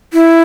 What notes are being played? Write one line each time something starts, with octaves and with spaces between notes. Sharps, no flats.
E4